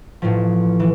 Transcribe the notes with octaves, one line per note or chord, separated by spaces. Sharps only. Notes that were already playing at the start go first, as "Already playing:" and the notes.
A1 A2 F3
E3